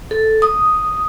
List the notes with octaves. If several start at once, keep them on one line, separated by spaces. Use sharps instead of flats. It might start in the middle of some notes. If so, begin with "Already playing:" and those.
A4
D#6